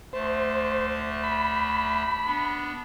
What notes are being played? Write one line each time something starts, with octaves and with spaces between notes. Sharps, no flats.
D2 A3 C5 A5
B5
B3 D4